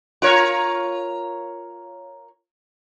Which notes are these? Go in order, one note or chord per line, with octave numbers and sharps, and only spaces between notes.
F4 A#4 C#5